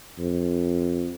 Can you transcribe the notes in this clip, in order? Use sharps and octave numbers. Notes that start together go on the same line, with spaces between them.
F2